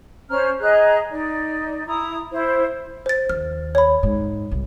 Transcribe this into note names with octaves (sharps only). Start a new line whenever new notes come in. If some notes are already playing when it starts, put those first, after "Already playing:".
C#4 C5 A#5 F6
G#4 D#5 A#5 F#6
D#4 D5
E4 A#5 D#6
E4 C5
C5 A6
D#2 F6
C#5 B5
G#2
C2